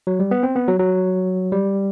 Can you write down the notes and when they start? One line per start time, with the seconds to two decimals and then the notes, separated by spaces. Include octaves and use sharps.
0.07 F#3
0.19 G3
0.31 B3
0.43 C4
0.56 B3
0.68 F#3
0.79 F#3
1.52 G3